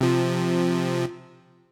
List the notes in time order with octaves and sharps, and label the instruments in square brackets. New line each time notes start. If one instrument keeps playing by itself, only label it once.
[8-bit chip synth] C3 F3